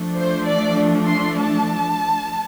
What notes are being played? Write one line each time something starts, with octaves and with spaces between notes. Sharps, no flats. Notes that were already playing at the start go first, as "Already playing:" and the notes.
Already playing: F3 A3 D4
C5
D5
C6
A5